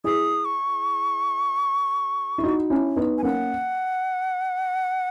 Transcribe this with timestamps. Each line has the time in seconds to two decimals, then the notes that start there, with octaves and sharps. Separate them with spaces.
0.04 E4 G#4 D#6
0.45 C#6
2.38 E4
2.44 D#4 F#4
2.70 C#4 E4
2.96 B3 D#4
3.18 G#5
3.23 A#3 C#4 F#5